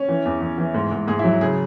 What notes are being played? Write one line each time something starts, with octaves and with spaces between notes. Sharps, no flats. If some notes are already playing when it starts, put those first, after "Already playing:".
Already playing: C#4
E3
E2
E2
E3
G#2
G#2
G#2 G#4
E4
F#3
C#3 G#4